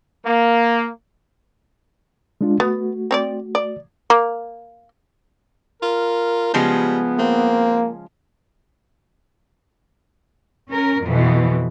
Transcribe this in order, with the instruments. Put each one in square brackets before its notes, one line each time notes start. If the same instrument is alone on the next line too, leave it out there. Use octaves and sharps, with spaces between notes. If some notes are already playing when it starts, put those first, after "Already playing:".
[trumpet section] A#3
[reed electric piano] G#3 D4 F4
[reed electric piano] A3 F#4 [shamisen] B3
[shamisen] C4 C#5 D5
D5
A#3
[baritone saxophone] F4 [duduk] A#4
[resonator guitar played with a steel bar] C#3 F3 G#3 [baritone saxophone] G3 [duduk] B3
[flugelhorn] A#3 [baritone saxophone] C4
[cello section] C#4 A#4
F2 B2 E3